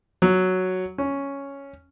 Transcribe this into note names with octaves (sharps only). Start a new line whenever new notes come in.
F#3
C#4